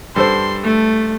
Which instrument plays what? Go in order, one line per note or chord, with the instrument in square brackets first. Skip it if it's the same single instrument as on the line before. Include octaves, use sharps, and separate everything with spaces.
[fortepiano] G2 A4 C5 [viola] C6
[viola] A3